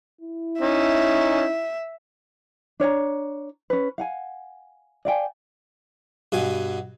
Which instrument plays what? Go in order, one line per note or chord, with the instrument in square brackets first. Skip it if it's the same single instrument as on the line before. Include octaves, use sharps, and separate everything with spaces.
[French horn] E4
[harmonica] C#4 D#4 [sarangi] E5
[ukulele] D4 C#5 D5 A#5
C#4 B4
F5 F#5 G#5
D5 F5 G5 G#5
[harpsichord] G2 B2 G#5